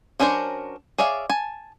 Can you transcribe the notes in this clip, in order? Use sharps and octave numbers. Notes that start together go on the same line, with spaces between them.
F#3 C#4 D4 A#4 C5
G#4 C#5 D5 E5 F5
G#5 A5